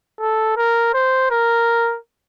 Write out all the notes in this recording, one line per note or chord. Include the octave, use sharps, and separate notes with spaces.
A4
A#4
C5
A#4